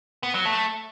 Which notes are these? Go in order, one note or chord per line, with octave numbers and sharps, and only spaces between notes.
B3
F#3
A3